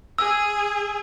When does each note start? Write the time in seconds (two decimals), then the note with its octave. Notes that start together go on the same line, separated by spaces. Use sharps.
0.18 G#4 E6